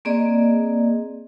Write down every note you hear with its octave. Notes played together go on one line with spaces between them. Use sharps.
A#3 C4 G#4 D5 D#5